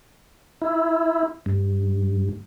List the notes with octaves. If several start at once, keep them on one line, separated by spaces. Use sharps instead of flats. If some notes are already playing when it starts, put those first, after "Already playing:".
E4
G2